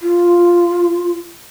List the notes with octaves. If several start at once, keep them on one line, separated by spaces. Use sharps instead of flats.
F4